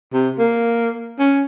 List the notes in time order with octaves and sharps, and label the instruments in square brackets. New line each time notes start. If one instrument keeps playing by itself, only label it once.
[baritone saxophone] C3
A#3
C#4